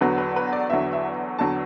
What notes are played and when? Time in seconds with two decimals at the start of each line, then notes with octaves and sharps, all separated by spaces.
0.01 E2 D3 F#3 B4
0.18 B4
0.36 B4
0.53 D5
0.70 E2 D3 F#3 E5
0.93 E5
1.39 E2 D3 F#3 A5